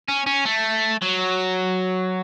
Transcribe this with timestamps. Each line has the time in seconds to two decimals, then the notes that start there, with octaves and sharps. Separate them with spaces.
0.09 C#4
0.26 C#4
0.45 A3
1.02 F#3